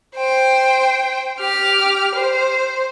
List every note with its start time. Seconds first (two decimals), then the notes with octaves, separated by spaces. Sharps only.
0.16 C5 G5
1.40 G4 F6
2.15 C5